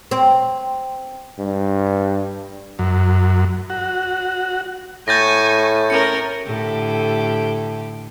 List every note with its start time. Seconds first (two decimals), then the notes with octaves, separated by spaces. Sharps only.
0.11 C4
1.39 G2
2.79 F#2
3.70 F#4
5.08 A2 G#5 C#6 G6 A6 A#6
5.90 C#4 A#4 C#7
6.43 A2 D3 G4